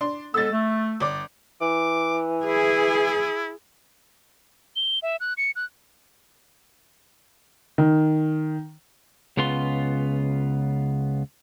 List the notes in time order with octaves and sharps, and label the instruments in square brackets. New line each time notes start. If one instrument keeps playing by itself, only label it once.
[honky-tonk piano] D4 C6
[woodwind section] G#3 B3 A4 [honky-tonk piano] E6 A6
[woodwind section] A3
[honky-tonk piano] G1 D5 D6
[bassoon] E3 [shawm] D6
[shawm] E4 [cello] G#4
[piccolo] G7
E5
F#6
C#7
F#6
[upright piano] D#3
[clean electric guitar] C#2 C#3 B3 F4 C6